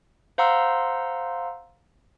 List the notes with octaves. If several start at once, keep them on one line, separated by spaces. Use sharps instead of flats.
C5 F5 F#5 A#5 C6 E6